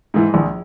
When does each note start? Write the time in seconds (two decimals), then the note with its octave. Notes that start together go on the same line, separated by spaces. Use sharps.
0.14 G#2 E3
0.34 A#1